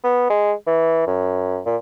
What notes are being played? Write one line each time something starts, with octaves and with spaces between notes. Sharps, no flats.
B3
G#3
E3
F#2
A#2